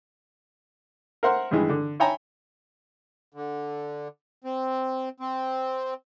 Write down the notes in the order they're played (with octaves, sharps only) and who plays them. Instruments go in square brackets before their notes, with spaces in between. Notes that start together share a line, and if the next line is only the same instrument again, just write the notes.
[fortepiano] A#4 C5 E5 F#5 C6
G2 D#3 E3 G#3
D3
C#5 E5 G5 G#5 A#5 B5
[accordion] D3
C4
C4